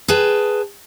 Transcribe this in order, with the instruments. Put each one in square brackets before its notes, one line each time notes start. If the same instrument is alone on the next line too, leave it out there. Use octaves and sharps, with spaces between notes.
[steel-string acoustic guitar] G#4 B4 G5 A5